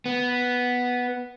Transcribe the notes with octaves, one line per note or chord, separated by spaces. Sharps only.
B3